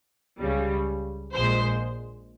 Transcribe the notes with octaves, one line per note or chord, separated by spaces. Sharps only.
C#2 C#3 G3
A#1 A#2 G#3 C5